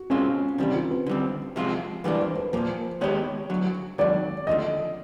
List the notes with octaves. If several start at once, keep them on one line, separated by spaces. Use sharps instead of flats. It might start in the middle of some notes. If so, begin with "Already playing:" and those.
Already playing: F#4
B2 G#3 C4 C#4 F4
E2 C3 D#3 G3 C4
F4
B4
D3 G3 C4
C3 F3 G#3 C4 F4
G#2 E3 G3 A#3 D4 B4
C5
B4
A#2 F3 A#3 C5
D#3 G#3 B3 D#4 G4 C#5
D2 D3 F#3
G#2 D#3 F#3 D5
D#2 D3 F3 A3 D#5